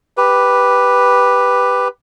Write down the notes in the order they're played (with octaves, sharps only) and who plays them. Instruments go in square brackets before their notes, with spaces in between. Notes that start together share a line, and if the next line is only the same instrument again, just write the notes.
[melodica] G4 B4